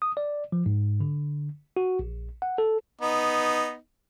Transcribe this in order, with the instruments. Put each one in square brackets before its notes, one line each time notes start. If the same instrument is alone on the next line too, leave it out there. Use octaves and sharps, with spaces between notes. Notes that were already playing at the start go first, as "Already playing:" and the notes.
[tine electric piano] D#6
D5
F3
G#2
D3
F#4
A#1
F#5
A4
[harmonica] B3 D#4